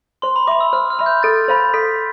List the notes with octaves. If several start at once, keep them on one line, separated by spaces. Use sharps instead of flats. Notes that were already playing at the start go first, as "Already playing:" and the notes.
C5 C6
B5
E5 B5 D6
E6
C5 F6
F6
E5 B5
G6
A4 A6
C5 F5 B5
A4 B6